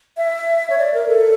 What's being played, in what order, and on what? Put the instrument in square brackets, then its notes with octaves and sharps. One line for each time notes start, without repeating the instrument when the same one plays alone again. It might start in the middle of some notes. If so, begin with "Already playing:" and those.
[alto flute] E5
C#5
D5
A#4
A4